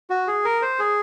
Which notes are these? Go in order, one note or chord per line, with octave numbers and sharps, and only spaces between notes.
F#4
G#4
A#4
C5
G#4